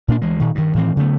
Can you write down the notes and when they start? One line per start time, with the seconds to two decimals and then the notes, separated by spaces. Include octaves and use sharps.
0.08 A#2 A#3 D4
0.22 D2 E3 G#3
0.40 A#2 D#3
0.55 G2 D#3
0.74 A2 D#3 E3 C4
0.97 C#3 F#3 A3 B3